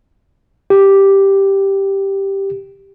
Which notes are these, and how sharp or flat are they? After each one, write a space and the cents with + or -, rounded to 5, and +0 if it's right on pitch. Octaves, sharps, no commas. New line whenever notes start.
G4 +0